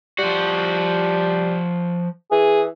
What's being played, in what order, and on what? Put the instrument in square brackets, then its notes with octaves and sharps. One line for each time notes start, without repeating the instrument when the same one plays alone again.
[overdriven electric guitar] F3 F#4 [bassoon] G3
[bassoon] E3 [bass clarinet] G#4